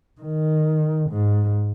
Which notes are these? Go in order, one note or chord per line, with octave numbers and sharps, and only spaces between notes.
D#3
G#2